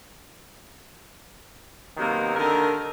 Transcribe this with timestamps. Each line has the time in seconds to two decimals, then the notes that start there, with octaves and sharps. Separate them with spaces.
1.98 C3 D#3 F#3 A#3 B3
2.36 D3 D#3 A#4